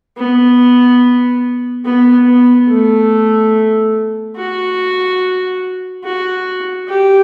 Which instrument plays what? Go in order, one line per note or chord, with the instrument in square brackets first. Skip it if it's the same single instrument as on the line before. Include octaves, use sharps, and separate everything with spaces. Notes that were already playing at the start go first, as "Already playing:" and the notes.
[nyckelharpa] B3
B3
B3
A3
F#4
F#4
G4